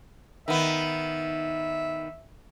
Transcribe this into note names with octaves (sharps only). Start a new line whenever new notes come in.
D#3 B3 E5